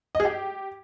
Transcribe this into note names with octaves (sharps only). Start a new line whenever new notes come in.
D#5
G#4
G4